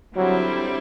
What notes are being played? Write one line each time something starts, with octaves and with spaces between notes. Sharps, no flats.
D3 F#3 G3 C4 E4